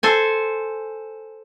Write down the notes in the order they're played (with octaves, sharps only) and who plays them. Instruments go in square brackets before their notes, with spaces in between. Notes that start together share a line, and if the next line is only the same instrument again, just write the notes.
[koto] A4 C5 G#5